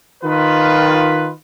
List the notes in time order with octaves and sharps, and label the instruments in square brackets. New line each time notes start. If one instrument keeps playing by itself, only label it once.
[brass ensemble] D#3 F4 B4